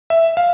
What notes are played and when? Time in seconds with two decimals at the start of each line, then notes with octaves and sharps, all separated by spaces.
0.10 E5
0.37 F5